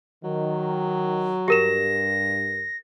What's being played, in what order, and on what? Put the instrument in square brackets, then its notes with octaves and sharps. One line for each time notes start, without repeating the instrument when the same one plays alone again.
[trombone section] D#3 [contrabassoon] F#3
[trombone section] G2 [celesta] G4 A#4 E7 [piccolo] A#6